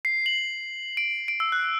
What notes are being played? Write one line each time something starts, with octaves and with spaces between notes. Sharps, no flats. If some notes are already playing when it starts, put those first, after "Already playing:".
C7
F#7
D7
D7
E6
F#6